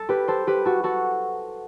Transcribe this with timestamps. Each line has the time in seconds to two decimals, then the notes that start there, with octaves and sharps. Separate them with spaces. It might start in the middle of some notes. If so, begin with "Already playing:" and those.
Already playing: A4
0.09 G4 B4
0.28 A4 C5
0.47 G4 B4
0.65 F#4 A4
0.84 F#4 A4